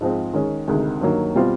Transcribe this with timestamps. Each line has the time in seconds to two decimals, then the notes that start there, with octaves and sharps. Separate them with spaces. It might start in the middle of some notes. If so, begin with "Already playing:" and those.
0.01 G#2 F3 G#3 C4
0.34 D#3 G#3 C#4
0.68 D2 C3 D#3 G#3
1.01 G2 D#3 F#3 A#3
1.35 B2 G3 C4 F4